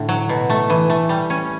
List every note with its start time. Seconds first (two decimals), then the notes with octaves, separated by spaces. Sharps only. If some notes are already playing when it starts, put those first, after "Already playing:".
Already playing: A2 D3
0.09 F#3
0.29 B2
0.50 A3
0.70 E3
0.90 A3
1.09 G3
1.30 C#4